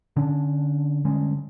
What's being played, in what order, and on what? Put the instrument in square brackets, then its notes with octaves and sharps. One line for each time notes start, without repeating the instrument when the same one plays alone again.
[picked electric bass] D3 C#4 D4
D3 G3 G#3 C#4